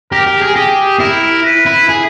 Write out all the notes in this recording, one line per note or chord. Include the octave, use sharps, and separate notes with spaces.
G4 A#4
G4
G#4
G4 G#4
E4 A#4
B4
E4
G#4